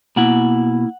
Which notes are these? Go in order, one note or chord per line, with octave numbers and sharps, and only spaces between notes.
B2 A#3 E4 F#5